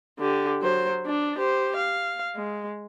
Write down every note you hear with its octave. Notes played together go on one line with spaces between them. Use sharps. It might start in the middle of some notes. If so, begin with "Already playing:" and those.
D3 G4
F#3 C5
D4
G4 C5
F5
G#3